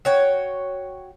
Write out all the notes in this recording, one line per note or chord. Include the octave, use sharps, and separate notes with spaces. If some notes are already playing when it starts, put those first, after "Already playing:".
F#4 C#5 G5